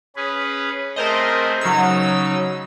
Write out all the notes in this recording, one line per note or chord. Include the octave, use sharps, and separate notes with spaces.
C#4 G#4 B4
A3 C4 G#4 A#4 C5 D#5
C#3 F#3 D#4 E6